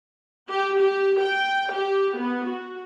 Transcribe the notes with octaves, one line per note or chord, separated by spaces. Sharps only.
G4
G4
G5
G4
B3
F#4